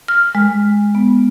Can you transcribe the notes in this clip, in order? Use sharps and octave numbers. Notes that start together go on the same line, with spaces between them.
F6
G#3
B3